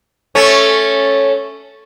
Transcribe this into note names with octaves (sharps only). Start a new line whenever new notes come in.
A3 C#4